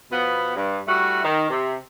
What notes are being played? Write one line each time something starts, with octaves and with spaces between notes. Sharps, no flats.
B2 F3 B3
G2
G3 A3 E4 F#4
D#3
C3